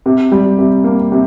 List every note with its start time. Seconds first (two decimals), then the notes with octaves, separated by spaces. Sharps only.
0.06 C3
0.32 G3
0.59 C3
0.84 A#3
1.12 C3